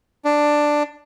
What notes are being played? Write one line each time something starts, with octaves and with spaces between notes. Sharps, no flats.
D4